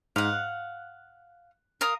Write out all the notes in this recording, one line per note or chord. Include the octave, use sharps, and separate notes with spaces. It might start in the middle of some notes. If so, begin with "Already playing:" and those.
G#2 F5 F#5
F#6
A#4 F5 D#6